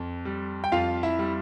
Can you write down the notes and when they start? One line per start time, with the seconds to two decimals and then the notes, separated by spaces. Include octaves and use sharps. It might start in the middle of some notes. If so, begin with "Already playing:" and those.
Already playing: F2
0.25 G3
0.64 G5
0.72 F2 F4 F5
1.03 E4 E5
1.19 G3